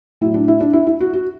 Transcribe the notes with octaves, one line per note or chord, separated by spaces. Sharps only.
A2 F#3 E4
D4
E4
D4
E4
E4
F#4
F#4